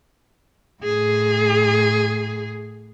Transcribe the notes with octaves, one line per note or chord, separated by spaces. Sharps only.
A2 G#4